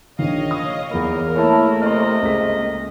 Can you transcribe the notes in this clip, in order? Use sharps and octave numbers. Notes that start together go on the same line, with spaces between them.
A#1 D#3 C#5 D#5 F5
D#6
E2 A#3 A#4 B5
A3 A#3 E4 C#5 A5
C3 D#5 C6 F6
C#2 B6